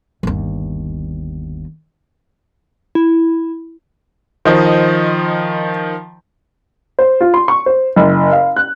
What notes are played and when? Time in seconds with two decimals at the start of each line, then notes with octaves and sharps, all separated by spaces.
0.23 G1 D#2
2.95 E4
4.45 D#3 F3 C5 D#5
6.99 C5
7.21 F4
7.34 C6
7.48 C#6
7.66 C5
7.96 F#1
8.32 F5
8.56 F#6